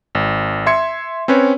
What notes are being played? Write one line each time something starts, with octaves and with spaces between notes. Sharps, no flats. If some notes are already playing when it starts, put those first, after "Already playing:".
G#1
E5 C6 G#6 C#7
C4 C#4 B4 C#5